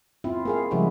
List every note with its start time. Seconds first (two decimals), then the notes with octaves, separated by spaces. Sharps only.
0.24 C4 E4 F4
0.45 A#3 G#4 F5
0.71 C#3 F3 G3 G#3 E4 F#4